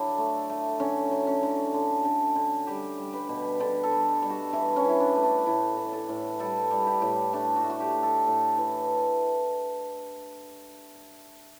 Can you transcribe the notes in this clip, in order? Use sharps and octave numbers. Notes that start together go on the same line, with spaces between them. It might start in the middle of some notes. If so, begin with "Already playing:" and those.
Already playing: D3 F#3 D4 E4
A3
A3
D3 C#4
F#3
C#4
D3
D3
D3
D3
G3 G4
G3
B4
B2
D3 A4
A4
G3
G3
F#4
E3 E4
C#4
E3 E4
D4
A3
D4
A2 E4
E3
A4
A2
G3 A4
G3
G4
A2
A3 D4
F#4
A3
F#4
G4
A3
A4
A2
E3